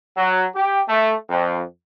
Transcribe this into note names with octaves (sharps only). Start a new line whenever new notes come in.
F#3
G4
A3
F2